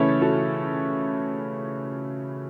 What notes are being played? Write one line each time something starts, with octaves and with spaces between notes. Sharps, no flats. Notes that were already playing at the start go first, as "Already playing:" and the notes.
Already playing: C#3 E3 A3 C#4 E4 A4 C#5
F#4 A4